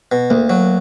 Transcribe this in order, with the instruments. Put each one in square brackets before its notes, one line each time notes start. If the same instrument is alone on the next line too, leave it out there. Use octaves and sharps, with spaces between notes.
[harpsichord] B2
[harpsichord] D2 [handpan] A#3
[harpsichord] F#3